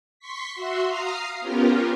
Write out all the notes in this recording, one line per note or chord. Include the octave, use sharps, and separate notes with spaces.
C6 C#6 B6
F#4 E5 C6
F5 A#5 D#6 F6 C7
B3 C#4 F4 G4 A#4